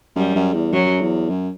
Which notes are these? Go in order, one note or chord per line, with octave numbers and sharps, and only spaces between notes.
F#2 G3
F#2
E2
F#2 F#3
E2
F#2